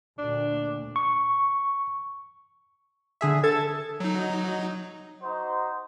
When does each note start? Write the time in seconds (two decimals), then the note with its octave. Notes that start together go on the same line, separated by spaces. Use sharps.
0.18 D2 A#2 D4
0.96 C#6
3.21 D3 G#4 E5
3.43 A4 G#6 A6
4.00 F#3 D#4
5.22 D#4 F#4 C5